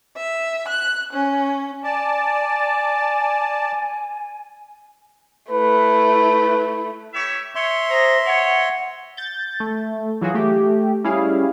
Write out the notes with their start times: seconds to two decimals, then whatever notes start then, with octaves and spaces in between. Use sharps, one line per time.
0.15 E5
0.68 F#6
1.12 C#4
1.84 D5 G#5 A5
5.51 A3 E4 B4
7.14 G4 C#5 E5
7.55 C#5 E5 C6
7.90 G#4 C5 A#5
8.26 C#5 F#5
9.17 G6 A6
9.60 A3
10.21 E3 F#3 F4 F#4 G#4
10.34 A3 G4
11.04 G3 C#4 E4 G#4 F5